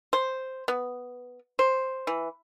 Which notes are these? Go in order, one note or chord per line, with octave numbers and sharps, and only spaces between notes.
C5
B3
C5
E3